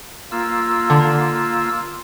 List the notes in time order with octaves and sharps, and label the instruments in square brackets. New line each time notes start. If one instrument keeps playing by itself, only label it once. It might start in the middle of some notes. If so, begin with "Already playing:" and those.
[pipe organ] A#3 F4 E6
[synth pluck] D3